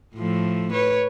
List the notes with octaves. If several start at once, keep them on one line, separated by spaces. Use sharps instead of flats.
A2 F3 A3
B4 C#5